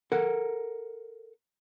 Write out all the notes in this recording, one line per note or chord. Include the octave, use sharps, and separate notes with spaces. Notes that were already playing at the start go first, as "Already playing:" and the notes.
A4 A#4 F#5